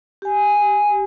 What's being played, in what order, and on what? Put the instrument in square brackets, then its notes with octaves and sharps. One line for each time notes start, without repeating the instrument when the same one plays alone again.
[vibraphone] G4 G#5